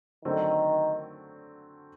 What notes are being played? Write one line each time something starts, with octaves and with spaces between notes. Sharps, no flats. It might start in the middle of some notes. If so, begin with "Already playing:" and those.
D3 D#3 F#3 A3 C4